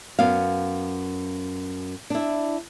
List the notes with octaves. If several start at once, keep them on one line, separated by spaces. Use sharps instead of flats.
F#2 B3 F5
D4 E4